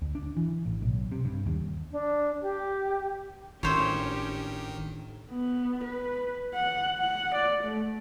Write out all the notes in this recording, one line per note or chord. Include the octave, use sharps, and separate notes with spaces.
D2
D4
E3
A1
B1
C3
G2
D#2
D4
G4
G#1 A2 D#3 C#4 D4 G4 C5 C#5
B3
B4
F#5
F#5
D5
A3